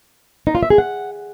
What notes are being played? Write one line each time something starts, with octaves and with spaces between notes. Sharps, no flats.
D#4
F4
E5
G#4
F#5